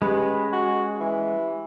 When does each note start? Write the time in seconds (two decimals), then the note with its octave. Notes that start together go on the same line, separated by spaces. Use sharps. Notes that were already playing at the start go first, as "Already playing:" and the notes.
0.02 G#3 C#4 G4 B4
0.52 F#4
1.00 E3